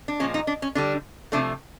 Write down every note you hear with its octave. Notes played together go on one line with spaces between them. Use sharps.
D4
A#2 F3 G#3 C#4
D#4
D4
C#4
D3 G3 D4
C3 F3 A3 D4